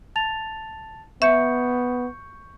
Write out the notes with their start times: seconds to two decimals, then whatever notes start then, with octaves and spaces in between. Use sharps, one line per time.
0.16 A5 A6 F7
1.22 B3 E5 C#6 G6 C#7